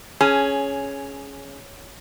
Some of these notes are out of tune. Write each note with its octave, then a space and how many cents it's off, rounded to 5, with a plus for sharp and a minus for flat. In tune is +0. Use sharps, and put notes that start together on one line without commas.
C#4 +0 G#4 +15